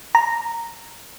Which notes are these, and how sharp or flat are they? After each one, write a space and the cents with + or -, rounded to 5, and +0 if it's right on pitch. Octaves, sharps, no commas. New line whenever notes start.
A#5 -5